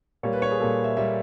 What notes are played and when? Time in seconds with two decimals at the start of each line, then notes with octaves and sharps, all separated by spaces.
0.23 A#2 G3 A#3 C#5
0.33 B4
0.42 C#5
0.51 G#4
0.60 A#2 G3 A#3 A4
0.84 E5
0.97 A#2 G3 A#3 E5